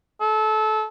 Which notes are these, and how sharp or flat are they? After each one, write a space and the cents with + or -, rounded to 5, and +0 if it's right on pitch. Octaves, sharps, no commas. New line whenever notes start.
A4 -25